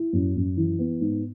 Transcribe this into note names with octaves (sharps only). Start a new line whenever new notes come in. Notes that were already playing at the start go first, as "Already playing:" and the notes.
Already playing: E4
F#2
F#2
E3
B3
G#2